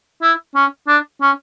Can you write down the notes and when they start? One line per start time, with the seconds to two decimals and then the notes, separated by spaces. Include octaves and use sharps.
0.22 E4
0.55 C#4
0.88 D4
1.21 C#4